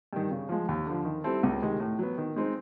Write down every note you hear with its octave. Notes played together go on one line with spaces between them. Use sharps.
G2 D#3
C#3
F3 G#3
D#2
D3 F3
D#3
G3 C4 E4 A4
C#2
C3 D#3 G#3
A2
F#3 B3
D#3
G#3 C4 D#4